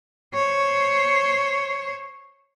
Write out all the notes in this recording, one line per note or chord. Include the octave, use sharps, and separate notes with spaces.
C5 C#5